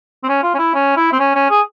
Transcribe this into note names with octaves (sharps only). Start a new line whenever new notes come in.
C4
C#4
F4
C#4
E4
C#4
E4
C4
C#4
C#4
G#4